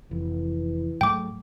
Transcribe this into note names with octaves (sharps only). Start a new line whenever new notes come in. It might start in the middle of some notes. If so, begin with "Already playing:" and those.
F1 E3
G#2 F#3 A3 G5 D6